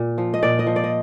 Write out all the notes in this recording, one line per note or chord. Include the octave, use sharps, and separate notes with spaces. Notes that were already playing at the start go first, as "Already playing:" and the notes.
Already playing: A#2
F3
D#5
A#2 D5
D#5
F3
D5
D#5